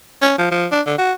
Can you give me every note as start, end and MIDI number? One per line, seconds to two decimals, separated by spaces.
0.22 0.34 61
0.38 0.51 53
0.51 0.66 53
0.72 0.81 62
0.86 0.97 50
0.98 1.13 66